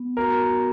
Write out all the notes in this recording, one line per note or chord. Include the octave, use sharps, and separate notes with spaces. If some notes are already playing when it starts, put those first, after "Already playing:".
Already playing: B3
F#4 A#4